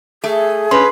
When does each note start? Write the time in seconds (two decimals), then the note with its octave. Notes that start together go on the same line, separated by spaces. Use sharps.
0.24 A3 G#4
0.71 C#4 B4 C6